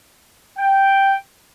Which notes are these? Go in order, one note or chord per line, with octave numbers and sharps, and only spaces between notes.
G5